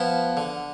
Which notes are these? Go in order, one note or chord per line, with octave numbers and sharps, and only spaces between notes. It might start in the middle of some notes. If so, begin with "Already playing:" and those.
Already playing: F3 B3 E4
D3